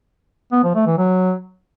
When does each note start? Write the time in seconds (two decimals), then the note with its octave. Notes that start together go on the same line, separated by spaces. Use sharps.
0.52 B3
0.63 F3
0.75 A3
0.86 E3
0.98 F#3